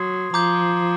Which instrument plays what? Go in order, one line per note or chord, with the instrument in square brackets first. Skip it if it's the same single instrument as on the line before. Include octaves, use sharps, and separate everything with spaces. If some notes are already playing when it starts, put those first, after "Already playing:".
Already playing: [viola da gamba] F#3 [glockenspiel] C6 D#6 G#6 C7
[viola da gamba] F3 [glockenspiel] A#5 D6 G6